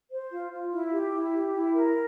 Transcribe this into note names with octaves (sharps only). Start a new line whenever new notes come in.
C5
F4
F4
E4
G4
E4
G4
E4
A#4